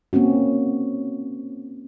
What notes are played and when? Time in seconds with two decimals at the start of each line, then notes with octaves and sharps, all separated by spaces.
0.13 A#3 C4 C#4 F#4